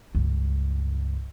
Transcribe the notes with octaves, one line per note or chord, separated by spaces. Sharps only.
C#2 G2